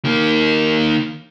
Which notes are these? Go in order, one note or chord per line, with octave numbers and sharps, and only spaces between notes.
D#3 A#3